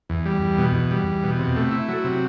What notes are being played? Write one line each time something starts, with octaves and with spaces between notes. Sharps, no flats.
E2
G3
E2
B2
E2
G3
E2
B2
C3
A3
E4
F#3
C3